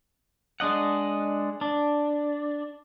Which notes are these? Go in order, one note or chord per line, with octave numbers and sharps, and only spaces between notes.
G#3 D4 D#5 F#5
D4